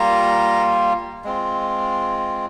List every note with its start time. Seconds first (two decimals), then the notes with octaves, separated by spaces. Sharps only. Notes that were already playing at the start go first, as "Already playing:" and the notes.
Already playing: G3 A#3 F4 A#5
1.24 G#3 C4 F4